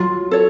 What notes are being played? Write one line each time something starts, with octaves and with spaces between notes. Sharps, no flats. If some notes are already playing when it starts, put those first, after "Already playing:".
Already playing: F#3 F4
A4 C#5